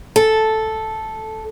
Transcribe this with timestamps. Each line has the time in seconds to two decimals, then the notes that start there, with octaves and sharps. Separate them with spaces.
0.16 A4